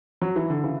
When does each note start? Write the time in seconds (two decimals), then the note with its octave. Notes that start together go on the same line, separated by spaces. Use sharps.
0.22 F#3
0.36 E3
0.50 D3
0.63 C#3 E3